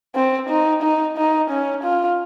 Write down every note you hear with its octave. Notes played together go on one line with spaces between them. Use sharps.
C4
D#4
D#4
D#4
C#4
F4